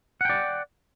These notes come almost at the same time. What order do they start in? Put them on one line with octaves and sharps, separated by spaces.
F#5 G5 D5